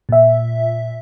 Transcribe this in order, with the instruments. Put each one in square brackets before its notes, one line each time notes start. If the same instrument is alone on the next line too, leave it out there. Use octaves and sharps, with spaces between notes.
[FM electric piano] A#2 E5